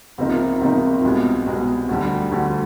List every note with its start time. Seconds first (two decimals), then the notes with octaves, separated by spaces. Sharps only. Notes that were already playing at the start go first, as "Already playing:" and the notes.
0.18 C#2 C3 F3 A#3 D#4
0.61 C#2 C3 F3 A#3 D#4
1.03 C2 B2 G#3
1.46 C2 B2 G#3
1.89 D2 D3 G3
2.31 D2 D3 G3